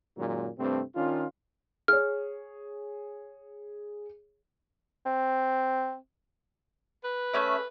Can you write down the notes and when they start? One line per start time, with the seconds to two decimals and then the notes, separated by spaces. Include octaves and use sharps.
0.17 F#2 A#2 D#3 F#3 G#3
0.58 G2 C3 A3 C4
0.96 D#3 C#4 D4 F4
1.88 G#4 C#5 F6
5.06 C4
7.04 B4
7.34 A3 C#4 E5